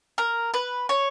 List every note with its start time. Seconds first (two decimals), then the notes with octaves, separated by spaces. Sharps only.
0.18 A#4
0.54 B4
0.89 C#5